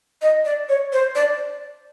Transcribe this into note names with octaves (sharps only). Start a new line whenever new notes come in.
D#5
D5
C#5
C5
D5